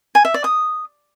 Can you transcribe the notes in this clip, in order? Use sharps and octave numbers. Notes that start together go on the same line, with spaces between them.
G#5
E5
D5
D#6